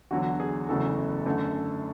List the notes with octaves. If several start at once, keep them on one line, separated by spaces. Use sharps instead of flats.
E2 D3 F#3 F#4
G#4
F#1 E2 C#3 F#3 A3 A4
F#2 D3 A3